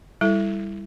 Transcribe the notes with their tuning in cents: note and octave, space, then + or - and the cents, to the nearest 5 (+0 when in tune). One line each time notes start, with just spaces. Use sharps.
G3 +15 E4 +0 A4 +0